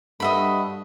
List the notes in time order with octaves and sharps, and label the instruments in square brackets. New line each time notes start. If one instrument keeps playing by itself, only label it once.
[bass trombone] G2 [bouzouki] A3 F#4 [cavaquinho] D#5 E5 B5